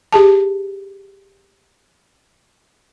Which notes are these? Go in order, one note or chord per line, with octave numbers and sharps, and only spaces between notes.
G4 G#4 A5